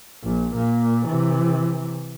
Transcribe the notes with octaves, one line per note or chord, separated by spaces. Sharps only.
A#1 A#2
A#2 A#3
C3 E3